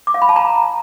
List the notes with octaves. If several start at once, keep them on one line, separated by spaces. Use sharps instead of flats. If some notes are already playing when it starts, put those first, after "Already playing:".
D6
F5
B5
A5
A#5